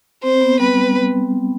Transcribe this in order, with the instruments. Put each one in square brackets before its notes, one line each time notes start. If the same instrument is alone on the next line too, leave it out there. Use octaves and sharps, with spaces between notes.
[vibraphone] C4 [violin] C5
[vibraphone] B3
[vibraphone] G3 [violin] B4
[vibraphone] G3